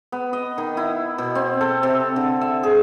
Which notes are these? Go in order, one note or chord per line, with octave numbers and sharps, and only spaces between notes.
B3
D#5
D#3
E4
B2
C4
A4
C3
D3
E5
G#4